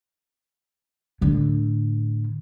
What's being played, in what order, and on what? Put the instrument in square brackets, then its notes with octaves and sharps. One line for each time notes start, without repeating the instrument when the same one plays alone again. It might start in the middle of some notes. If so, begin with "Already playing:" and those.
[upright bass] A2 D3